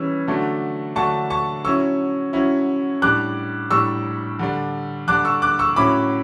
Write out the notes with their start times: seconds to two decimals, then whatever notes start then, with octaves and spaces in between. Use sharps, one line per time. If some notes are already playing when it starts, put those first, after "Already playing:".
Already playing: E3 G3 C#4 E6
0.27 D3 F#3 A3 D4
0.96 D3 F#3 A3 D4 A5 C#6
1.30 A5 C#6
1.65 F#3 C#4 E4 C#6 E6
2.33 F#3 C#4 E4
3.02 A2 G3 D4 D6 F#6
3.70 A2 G3 D4 C#6 E6
4.39 D3 G3 D4
5.08 D3 G3 D4 D6 F#6
5.25 C#6 E6
5.42 D6 F#6
5.59 C#6 E6
5.76 A2 F#3 C#4 E4 B5 D6